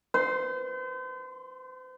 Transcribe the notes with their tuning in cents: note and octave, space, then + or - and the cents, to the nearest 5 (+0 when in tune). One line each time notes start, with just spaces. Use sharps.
C5 -40 C6 +0